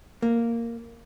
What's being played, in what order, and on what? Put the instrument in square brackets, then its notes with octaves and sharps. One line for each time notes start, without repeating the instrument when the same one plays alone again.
[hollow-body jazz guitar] A#3